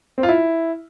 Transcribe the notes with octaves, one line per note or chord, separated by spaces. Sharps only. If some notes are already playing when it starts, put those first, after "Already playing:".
C4
F4
E4